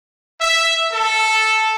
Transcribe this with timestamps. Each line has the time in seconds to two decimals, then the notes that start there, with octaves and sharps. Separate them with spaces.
0.40 E5
0.93 A4